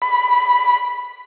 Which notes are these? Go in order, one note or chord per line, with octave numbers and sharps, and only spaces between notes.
B5